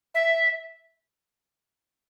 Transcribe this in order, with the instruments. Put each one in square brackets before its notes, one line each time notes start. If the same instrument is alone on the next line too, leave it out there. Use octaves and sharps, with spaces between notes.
[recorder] E5